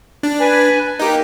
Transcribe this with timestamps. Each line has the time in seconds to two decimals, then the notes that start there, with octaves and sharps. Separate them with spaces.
0.23 D4
0.40 B4 G#5
0.99 A#3 D#4 G4